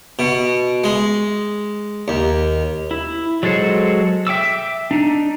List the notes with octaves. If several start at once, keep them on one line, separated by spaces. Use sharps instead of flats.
B2
G#3
D#2
E4
F#3 G#3 A4 C5 C#5
E5 G5 D6 E6
D4 D#4